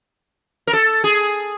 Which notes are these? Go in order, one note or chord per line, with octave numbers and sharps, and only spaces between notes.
A#4
A4
G#4